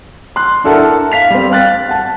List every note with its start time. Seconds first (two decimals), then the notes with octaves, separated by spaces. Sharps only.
0.36 C6 F#6
0.64 D4 E4 A4 A#4 F#5 A5
1.12 F5 B6 F7
1.30 G3 C4
1.50 F5 G5 F#6 A6
1.88 F#5 A5